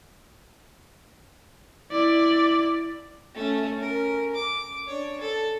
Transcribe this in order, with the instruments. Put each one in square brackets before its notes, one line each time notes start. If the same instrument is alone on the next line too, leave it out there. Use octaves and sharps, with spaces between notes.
[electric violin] E4 D5
[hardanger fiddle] A3 C#4
C#4 A#4
D6
D4 C#5
A4